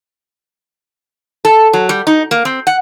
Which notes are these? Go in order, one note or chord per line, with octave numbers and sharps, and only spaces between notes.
A4
F#3
G3
D#4
A#3
C4
F#5